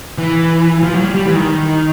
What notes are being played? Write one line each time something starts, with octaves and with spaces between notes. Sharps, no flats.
E3
F3
F#3
G3
G3
E3
D#3